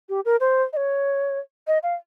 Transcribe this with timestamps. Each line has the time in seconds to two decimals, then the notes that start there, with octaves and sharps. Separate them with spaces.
0.09 G4
0.25 A#4
0.40 C5
0.73 D#5
0.77 C#5
1.67 D#5
1.83 F5